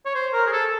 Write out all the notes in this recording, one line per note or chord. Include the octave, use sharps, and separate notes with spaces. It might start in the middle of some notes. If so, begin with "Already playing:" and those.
C#5
C5
A#4
G#4
A4